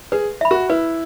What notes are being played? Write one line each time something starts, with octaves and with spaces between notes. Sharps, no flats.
G#4 B4
E5 B5
F#4
E4 B4